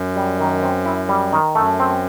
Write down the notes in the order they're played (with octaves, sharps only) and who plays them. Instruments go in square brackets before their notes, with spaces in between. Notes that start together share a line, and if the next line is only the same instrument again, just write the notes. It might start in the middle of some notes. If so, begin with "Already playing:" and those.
Already playing: [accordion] F#2
[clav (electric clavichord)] G3
D#3
C4
E4
G3
D#3
[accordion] F#2 [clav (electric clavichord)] A3
[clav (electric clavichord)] C4